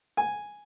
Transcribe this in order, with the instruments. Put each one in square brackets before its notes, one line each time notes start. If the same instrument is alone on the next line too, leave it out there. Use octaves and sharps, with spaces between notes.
[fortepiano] G#5